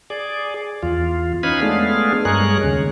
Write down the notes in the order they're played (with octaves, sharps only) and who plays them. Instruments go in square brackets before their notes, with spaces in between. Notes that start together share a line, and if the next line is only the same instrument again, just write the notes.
[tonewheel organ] G#4 D5
E2 F4
C#4 D#4 B4 F5 G#5 B5
G#3 A3 B3 D4 G#4 F5
G2 G#3 G#4 A#4 C#5 F#6
D#2 C#3